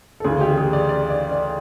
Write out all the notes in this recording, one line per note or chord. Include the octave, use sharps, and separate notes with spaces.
A4
D2 C#3 E3 G#4
G4
G#4
D5
D5
D5
D5